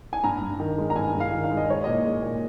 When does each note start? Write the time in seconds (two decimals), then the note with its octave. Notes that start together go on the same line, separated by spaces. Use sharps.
0.13 G#5
0.24 G2 A#5
0.41 G2
0.60 D#3
0.78 G#3
0.90 A#5
0.95 G2 G#5
1.15 G2
1.20 F5
1.32 D#3
1.44 F5
1.51 G#3
1.57 D#5
1.69 G#3 C#5
1.84 A#2 D#5
2.05 G#3
2.23 A#2